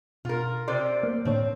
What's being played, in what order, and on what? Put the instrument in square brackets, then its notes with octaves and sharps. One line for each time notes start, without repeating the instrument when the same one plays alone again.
[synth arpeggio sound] B2 [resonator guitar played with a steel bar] F4 A#4
[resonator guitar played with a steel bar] C3 C5 D5 [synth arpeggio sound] C6
[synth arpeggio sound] A#3
[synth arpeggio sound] A2 D3 C#5 [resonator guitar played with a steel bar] C4